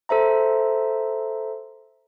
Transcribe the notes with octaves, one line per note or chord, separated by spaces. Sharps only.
A4 C5 E5 A#5